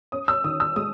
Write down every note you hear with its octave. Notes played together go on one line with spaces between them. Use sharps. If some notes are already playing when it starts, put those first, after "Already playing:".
C#4 D#6
E6
D#3 D#6
E6
G#3 D#6